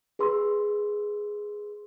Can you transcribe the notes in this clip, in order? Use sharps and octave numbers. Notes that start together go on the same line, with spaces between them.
G#4 B4 C6 E6